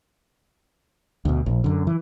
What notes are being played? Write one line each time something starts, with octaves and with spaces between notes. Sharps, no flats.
D2 B2
A#1
F#2 D3
E3